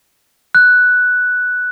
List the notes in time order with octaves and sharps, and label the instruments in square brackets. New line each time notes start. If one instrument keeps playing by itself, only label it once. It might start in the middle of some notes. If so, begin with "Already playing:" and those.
[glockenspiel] F#6